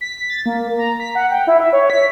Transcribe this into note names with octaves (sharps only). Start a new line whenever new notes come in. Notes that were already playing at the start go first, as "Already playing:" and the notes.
B6
A6
A#3
A#5
B6
F#5
G5
E4
E5
C#5
B6